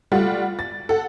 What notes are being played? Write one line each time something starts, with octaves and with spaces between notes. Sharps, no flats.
G3 A3 F4 F#4 F#5
A6
A4 F#5